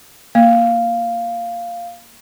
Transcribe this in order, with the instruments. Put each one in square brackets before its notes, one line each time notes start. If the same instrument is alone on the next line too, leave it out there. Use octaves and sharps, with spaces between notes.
[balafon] A#3 [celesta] F5